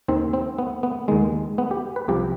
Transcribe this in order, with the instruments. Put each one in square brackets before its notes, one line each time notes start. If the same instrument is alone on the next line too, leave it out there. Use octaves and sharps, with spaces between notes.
[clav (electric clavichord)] D#2 D#3 C4
C4
B3
B3
D#2 D#3 G#3
B3
G4
B4
C2 C3 F3 G4